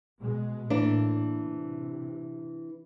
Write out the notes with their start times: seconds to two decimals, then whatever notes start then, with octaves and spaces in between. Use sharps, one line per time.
0.20 B2 G#3
0.70 A2 E3 A3 A#3 D4
1.46 C3